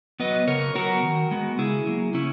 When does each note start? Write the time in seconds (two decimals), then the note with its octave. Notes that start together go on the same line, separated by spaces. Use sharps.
0.20 F#3 B3 B4 D#5
0.47 C#3 A#4 C#5
0.75 F#3 B3 F#4 A#4
1.03 D#3
1.31 G#3 B3
1.58 C#3 E4 G#4
1.87 F#3 A#3
2.14 C#3 C#4 E4